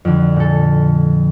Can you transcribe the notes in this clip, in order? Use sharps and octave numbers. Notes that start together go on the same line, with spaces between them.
F2 D3
A#2 A4